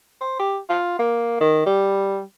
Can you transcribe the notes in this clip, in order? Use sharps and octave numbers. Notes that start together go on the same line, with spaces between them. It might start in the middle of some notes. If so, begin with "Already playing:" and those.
C5
G4
F4
A#3
D#3
G3